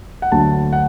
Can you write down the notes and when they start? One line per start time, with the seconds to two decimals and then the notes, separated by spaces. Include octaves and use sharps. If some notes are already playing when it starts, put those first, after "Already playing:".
0.22 F#5
0.32 D2 D3 F#3 A3 A5
0.73 F#5